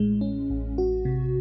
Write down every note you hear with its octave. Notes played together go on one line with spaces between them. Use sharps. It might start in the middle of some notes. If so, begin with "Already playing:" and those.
Already playing: A1 A2 G#3
C#4
A1
F#4
C3